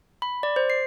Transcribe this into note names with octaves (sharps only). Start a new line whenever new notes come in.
B5
D5
C5
C7